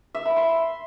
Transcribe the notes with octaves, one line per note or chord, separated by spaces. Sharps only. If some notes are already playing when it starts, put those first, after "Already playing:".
E5
B5
C6